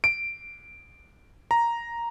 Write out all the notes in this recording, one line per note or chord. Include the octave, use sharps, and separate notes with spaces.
D7
A#5